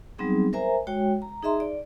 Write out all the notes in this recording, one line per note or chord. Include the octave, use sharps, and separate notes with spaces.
F#3 G3 B3 C4 D#4 G#4
A#4 C5 E5 G#5 A#5
G#3 F#4 C#5 G5
A#5
D#4 G#4 D#5 E5 A#5 C6
D5